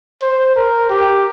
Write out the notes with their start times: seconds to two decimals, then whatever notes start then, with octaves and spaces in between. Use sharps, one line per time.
0.22 C5
0.56 A#4
0.90 G4